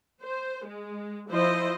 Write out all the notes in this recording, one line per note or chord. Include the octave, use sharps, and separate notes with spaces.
C5
G#3
F3 E4 C5 D#5